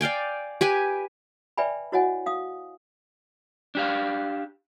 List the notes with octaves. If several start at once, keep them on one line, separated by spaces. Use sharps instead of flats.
D5 F5 G5 G#5
G4 B4 G#5
B4 D5 E5 G5 G#5 B5
E4 F#4 C#5 D#5 F#5 G#5
F5 D#6
D4 G4 F5